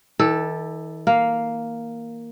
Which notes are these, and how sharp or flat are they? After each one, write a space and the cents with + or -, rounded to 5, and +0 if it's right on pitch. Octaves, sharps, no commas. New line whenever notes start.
E3 -45 A4 +0 D5 +15
A#3 +0 F5 +0